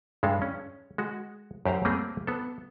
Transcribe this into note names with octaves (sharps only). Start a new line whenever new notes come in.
G2 G#3 A4 F5
C#4
G#3 F#4
F#2 G4 C5 F5 A#5
G3 A3 A#3 C4 G4 G#4
B3 A4